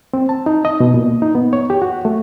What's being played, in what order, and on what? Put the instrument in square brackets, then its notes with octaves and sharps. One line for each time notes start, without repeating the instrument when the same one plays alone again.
[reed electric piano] C4
A5
D#4
D#5
B2
A#2
D#4
B3
C#5
G4
F#4
A3